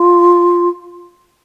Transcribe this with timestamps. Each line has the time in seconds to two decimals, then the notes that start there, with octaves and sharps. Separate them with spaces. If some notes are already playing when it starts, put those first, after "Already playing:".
Already playing: F4